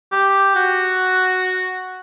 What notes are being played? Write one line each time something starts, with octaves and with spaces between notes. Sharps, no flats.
G4
F#4